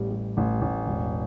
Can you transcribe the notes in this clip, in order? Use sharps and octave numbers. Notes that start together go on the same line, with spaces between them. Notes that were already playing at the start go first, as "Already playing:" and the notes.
Already playing: A1 A2 G3
G3
A1
A1
E1